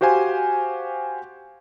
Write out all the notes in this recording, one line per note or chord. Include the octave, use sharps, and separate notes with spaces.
F#4 G4 C5 F5 G#5 C6